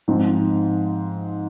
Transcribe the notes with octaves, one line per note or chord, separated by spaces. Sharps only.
G#2 F3 C4